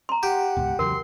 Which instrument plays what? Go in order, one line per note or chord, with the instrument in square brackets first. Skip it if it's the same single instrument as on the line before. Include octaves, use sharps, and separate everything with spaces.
[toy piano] A#5 C6
[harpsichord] G4 [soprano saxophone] F#5
[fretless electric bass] C#2 G#2 B2
[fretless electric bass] E2 C#3 F#3 [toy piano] A#4 [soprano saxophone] C6